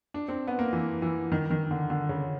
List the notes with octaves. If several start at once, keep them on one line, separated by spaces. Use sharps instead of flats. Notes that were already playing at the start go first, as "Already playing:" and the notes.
D4
C4
B3
A#3
E3
E3
D#3
D#3
D3
D3
C#3